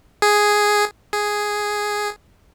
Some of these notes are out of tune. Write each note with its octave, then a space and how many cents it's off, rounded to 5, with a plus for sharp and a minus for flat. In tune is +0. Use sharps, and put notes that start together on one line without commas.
G#4 +0
G#4 +0